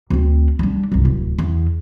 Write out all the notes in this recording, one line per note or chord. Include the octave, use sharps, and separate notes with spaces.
D2 C4
G3 D4
G1 C2
D1
E2